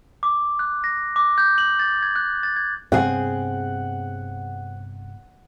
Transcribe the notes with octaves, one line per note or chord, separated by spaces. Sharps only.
D6
F#6
A#6
D6
G6
F#7
A6
G#6
F#6
A6
G#6
G2 C3 B3 C4 G#4 F#5